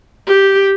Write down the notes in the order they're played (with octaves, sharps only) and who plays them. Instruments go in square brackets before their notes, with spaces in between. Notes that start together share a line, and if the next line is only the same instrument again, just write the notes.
[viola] G4